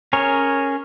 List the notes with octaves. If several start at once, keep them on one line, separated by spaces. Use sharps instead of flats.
C#4 G#4 A#4 C#5